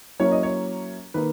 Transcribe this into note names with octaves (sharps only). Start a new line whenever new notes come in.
F#3 A#3 C#4 E4 C#5
D#5
C#5
D#3 A#3 B4